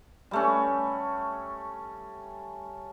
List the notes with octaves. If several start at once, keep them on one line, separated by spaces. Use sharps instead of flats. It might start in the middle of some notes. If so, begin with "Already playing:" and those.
G3 A3 C#4